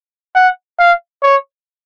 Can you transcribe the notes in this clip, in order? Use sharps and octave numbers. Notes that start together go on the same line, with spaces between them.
F#5
F5
C#5